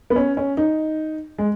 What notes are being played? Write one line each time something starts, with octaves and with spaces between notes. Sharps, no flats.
B3
C#4
C#4
D#4
G#3